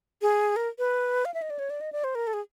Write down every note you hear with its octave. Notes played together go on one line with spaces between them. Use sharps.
G#4
A#4
B4
F5
E5
D#5
D5
C#5
D5
D#5
D5
C5
A#4
A4
G#4